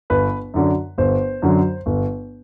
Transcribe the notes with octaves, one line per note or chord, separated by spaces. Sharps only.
G1 B4
F#2 D3 F#3
G1 C5
F#2 D3 F#3
G1